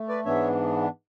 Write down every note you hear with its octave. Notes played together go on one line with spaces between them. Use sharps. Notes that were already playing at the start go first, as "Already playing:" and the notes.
Already playing: A3
B4 D5
G#2 E3 B3 D4 C#5 E5